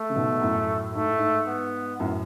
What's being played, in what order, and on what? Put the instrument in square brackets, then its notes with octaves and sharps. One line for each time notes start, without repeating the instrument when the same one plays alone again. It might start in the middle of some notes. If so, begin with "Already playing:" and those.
Already playing: [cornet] A3
[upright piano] C#3
G#2 B2
F#2 A2
[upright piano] G#2 [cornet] A3
[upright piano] A2
G#2
[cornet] B3
[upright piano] F#2 A2